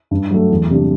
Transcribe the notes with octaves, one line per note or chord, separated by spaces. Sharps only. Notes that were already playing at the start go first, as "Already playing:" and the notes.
G2
F#3 A3
E2
C3 G3 D4